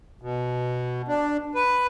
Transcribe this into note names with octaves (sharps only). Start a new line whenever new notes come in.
B2
D4
B4